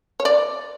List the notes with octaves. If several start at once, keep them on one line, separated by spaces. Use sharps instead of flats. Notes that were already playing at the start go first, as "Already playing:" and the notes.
C#5
D5